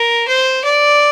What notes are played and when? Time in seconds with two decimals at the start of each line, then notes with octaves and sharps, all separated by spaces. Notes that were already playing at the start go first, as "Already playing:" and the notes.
Already playing: A#4
0.27 C5
0.64 D5